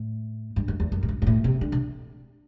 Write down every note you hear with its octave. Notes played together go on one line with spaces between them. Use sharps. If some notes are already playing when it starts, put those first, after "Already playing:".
Already playing: A2
G2
F#2
E2
F#2
A2
G2
G2
A2
C3
D3
C3